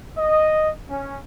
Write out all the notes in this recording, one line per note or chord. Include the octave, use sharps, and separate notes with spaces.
D#5
C#4